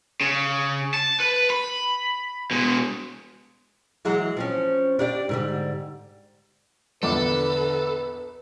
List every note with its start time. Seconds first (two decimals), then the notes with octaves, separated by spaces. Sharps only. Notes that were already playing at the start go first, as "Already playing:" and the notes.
0.21 C#3
0.94 A5
1.20 B4
1.50 B5
2.51 B2 G#3
4.05 E3 F#3 G#3
4.37 F3 C4 C#4
4.99 D4 G4 D5
5.29 G#2 D3 G3
7.03 A#1 E2 D3 A4 B4 D6